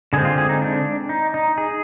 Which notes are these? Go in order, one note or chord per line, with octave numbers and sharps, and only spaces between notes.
D3 G#3 C4 G#4
F4
G#4
D#4
D4
D#4
D#4
G#4